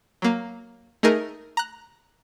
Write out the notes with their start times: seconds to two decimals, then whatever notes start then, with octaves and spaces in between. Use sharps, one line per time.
0.22 F#3 A#3
1.03 A3 D#4 G#4 A#4
1.57 A#5 F#6